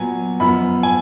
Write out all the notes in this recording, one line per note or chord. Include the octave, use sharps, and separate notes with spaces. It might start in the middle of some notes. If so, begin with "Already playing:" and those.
Already playing: A#2 F#3 B3 G#5
F#2 F3 B3 B5
G#5